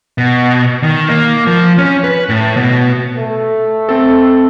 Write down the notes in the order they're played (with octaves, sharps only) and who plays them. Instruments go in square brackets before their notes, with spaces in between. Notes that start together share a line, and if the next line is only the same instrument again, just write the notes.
[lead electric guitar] B2
D#3
A#3
F3
C#4
B4
A2
B2
[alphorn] A3
[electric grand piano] C4 A4